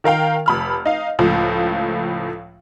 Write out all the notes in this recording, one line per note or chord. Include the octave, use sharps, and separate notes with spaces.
D#3 A#4 F5 G5
F1 B5 F6
D#4 F5
C#2 A2 F3